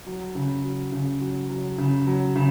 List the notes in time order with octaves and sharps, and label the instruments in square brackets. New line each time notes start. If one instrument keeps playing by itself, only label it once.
[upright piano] F#3
C#3
F#3
C#3
F#3
F#3
C#3
F#3
C#3